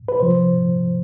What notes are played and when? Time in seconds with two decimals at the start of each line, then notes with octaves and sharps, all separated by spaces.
0.08 B4
0.20 C3 F3 C5